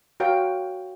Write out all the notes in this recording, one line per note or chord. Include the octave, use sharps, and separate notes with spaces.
F#4 A#4 C#5 F5 G5